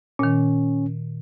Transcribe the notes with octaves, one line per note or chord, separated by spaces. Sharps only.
A#2 D#3 C#4